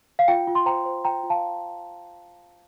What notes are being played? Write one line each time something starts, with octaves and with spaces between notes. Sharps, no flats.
F5
F4 G5
F4
C6
C5 G5 A#5
C5
F4 G5 A#5
F4
F5 A5